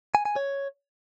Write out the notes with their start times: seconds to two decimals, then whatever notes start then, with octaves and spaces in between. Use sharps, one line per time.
0.15 G#5
0.25 G#5
0.36 C#5